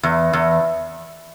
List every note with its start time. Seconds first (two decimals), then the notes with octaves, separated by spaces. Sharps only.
0.03 E2
0.33 E2